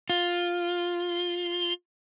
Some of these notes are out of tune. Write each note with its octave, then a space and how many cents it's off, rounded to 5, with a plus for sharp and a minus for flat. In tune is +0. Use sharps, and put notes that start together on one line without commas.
F4 +5